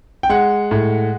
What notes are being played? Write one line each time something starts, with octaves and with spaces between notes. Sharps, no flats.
G5
G#3 F#5
A2